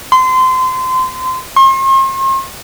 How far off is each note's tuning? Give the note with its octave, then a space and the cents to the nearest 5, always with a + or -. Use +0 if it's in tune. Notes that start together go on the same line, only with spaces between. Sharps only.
C6 -25
C6 +45